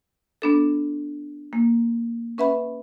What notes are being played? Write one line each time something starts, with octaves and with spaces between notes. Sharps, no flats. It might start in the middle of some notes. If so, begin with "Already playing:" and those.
B3 D4 A4
A#3
C#4 B4 E5 F#5 B5